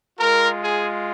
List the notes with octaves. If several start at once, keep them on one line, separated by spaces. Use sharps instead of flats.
G#3 F4 A#4
G#4